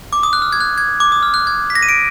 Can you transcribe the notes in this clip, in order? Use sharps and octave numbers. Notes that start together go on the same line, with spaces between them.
D6
D#6
F#6
F6
G#6
F#6
G#6
D6
D#6
F6
F#6
G#6
B6
A#6
D#7
D7